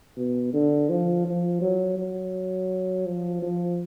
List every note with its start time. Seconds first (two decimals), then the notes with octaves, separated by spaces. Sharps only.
0.17 B2
0.53 D3
0.90 F3
1.26 F3
1.62 F#3
1.98 F#3
3.06 F3
3.43 F3